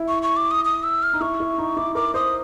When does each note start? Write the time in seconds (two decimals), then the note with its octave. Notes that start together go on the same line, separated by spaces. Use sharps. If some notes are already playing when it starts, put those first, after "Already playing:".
Already playing: E4
0.08 C#6
0.23 C#6
0.36 D6
0.51 D#6
0.65 D#6
0.83 E6
1.03 F6
1.14 D#4
1.21 E4 C#6
1.40 E4
1.58 D#4
1.77 E4 D6
1.95 A#4 D6
2.14 C5 D#6